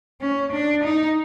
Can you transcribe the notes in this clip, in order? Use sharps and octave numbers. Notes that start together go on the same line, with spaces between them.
C#4
D4
D#4